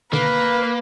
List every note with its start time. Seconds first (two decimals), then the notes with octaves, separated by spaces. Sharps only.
0.13 B2 D3 D#3 A#3 B4